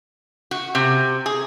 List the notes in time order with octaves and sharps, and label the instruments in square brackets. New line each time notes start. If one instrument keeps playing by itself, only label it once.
[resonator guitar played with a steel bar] F#4
C3
G#4